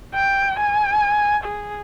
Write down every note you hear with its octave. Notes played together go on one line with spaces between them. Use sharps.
G5
G#5
G#4